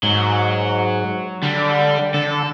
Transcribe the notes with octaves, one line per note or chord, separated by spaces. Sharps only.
G#2 F#3
D3 G3
D3 A4